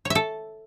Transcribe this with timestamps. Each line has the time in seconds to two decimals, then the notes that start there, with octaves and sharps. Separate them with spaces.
0.05 C#5
0.10 E5
0.15 A4